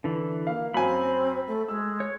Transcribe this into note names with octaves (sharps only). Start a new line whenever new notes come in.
D3 E3
A#3 F5
F#2 C4 G#5 B5
A3
G#3 E6
C#5